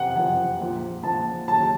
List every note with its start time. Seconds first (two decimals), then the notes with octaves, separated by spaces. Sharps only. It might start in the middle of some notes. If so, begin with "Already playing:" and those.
Already playing: F#1 F2 C3 F3 F#5
0.15 F#1 F2 C3 F3 F#5
0.60 A#1 A#2 F3
1.03 A#1 A#2 F3 A5
1.48 D#2 C#3 F#3 A5